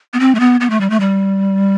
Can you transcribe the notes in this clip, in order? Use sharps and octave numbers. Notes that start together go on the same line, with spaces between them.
B3
C4
A3
B3
B3
A3
G3
A3
G3